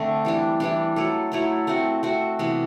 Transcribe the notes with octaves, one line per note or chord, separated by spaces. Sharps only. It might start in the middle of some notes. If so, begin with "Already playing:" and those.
Already playing: D3 A3 C4
E3 G3 D4
E3 G3 D4
F#3 A3 E4 A4
F#3 A3 E4 A4
A3 C4 F#4
A3 C4 F#4
C3 E3 B3